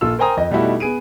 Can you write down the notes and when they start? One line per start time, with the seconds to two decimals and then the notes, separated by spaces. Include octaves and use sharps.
0.01 A#1 F4 A4 E6
0.19 A#4 C5 G5 G#5 A#5 D#6
0.37 F2 D#5
0.50 B2 G3 A3 D#4 E4 F#4
0.80 B3 G#4 D7 D#7